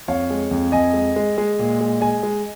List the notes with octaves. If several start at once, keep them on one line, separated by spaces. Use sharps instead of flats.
F2 C#5 F5
G#3
F2
F2 D#5 G#5
G#3
G#3
G#3
A#2
G#3
G#3 D#5 G#5
G#3